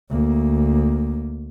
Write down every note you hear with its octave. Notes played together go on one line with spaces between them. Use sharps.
D2 A#3